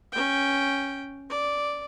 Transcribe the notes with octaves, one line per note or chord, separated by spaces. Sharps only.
C#4 G5
D5